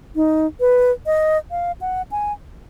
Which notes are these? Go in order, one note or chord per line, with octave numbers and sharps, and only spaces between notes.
D#4
B4
D#5
F5
F#5
G#5